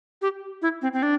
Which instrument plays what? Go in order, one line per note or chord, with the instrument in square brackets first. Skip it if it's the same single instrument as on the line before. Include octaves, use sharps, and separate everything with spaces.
[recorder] G4
E4
C4
C4
D4